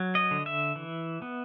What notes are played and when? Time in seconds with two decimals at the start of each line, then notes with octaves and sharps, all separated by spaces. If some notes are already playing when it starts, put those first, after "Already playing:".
Already playing: F#3
0.15 D#5
0.31 D3
0.46 E5
0.76 E3
1.22 B3